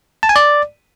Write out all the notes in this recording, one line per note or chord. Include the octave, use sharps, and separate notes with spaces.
A5
G#5
D5